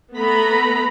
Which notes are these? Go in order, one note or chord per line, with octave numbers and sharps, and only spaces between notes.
A3 B3 A#5 B5